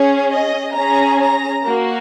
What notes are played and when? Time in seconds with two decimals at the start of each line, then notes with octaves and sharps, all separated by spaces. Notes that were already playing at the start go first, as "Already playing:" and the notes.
Already playing: C#4 G#4 C#5
0.31 D#5
0.75 C#4 G#4 A#5
1.21 A#5
1.66 A#3 F#4